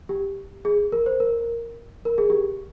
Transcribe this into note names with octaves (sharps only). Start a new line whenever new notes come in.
G4
G#4
A#4
C5
A#4
A#4
G#4
G4